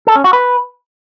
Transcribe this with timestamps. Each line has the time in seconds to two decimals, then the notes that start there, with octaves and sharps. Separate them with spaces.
0.07 A4
0.16 C#4
0.24 F#4
0.33 B4